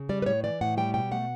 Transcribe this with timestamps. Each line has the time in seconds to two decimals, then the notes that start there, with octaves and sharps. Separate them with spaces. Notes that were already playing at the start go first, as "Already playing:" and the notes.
Already playing: C#3
0.09 G3 D5
0.22 B4
0.26 A2 C#5
0.44 E3 D5
0.61 A2 F#5
0.77 G3 G5
0.94 B2 G5
1.11 A3 F#5